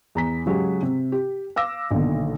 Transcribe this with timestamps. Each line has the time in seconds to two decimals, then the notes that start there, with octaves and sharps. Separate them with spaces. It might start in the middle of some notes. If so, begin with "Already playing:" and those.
0.15 E2 A#5 B6
0.46 C#3 F#3 G#3 G4 G#4
0.83 C3
1.12 G4
1.56 F5 D6 E6 A#6
1.91 B1 A#2 D3 D#3